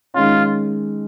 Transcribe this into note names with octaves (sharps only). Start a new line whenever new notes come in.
D#3 G#3 C#4 F4